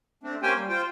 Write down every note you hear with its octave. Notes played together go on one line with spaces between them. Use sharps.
A3 C4 D4
A#3 C#4 G4 C5 G5 G#5
G3
F4 C5 G5